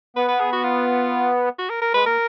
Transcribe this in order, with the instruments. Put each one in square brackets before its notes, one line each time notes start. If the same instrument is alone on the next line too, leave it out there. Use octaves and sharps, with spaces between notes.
[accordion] B3 [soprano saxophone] B4
[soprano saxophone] B4
G#4
F#4
F4
F#4
A#4
A#4
[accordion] G#3 [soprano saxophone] B4
[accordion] A#3 [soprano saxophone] A#4